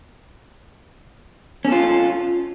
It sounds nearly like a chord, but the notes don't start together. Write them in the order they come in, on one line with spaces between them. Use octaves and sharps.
C#4 A4 F4